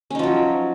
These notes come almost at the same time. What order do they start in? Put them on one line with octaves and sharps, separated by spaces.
C#4 D#4 F3 F#3